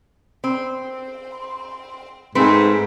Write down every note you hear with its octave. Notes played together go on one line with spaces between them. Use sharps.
C4
G#2 A3 C4 B4